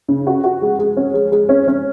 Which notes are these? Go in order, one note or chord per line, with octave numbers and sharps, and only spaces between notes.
C#3
F#4
F#4
G#3
G#3
C#4
G#3
G#3
C#4
C#4